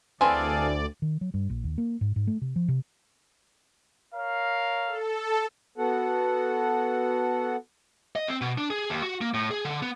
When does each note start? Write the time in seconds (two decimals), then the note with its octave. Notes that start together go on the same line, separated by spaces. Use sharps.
0.21 D2 E3 C4 G#4 A4 D5 F5 G#5
1.02 D#3
1.21 F#3
1.34 G2
1.50 A#1
1.64 D#2
1.78 A#3
2.01 G#2
2.16 G#2
2.27 A3
2.41 C3
2.56 F3
2.68 C3
4.15 A#4 C#5 F5
4.86 A4
5.78 B3 F#4 A4 F#5
8.16 D#5
8.28 C4
8.41 B2
8.58 D4
8.70 G#4
8.90 D#2
9.02 F#4
9.21 A#3
9.34 A2
9.51 G#4
9.65 D3
9.82 B3